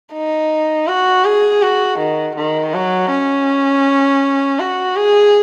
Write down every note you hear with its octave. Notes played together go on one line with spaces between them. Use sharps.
D#4
F#4
G#4
F#4
D#3
D#3
F#3
C#4
F#4
G#4